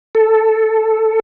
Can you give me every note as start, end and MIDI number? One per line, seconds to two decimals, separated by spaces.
0.15 1.20 69